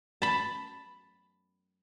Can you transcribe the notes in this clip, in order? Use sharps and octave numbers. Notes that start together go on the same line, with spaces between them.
A5 B5